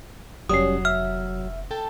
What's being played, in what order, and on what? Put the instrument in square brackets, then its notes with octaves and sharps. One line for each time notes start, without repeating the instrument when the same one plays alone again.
[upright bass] F1 [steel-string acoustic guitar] F#3 [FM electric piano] G3 C#4 [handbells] D#6 C7
[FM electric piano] E5 [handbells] F6
[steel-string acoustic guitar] A4 G5 A5